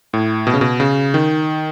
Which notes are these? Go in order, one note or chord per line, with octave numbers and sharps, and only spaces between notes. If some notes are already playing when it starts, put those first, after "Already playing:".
A2
B2
C#3
B2
C#3
D#3